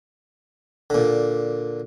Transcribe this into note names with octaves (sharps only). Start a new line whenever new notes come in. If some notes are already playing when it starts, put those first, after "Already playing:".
A#2 D3